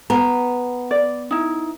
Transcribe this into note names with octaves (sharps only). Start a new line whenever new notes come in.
B3 A#5
D5
D#4 E4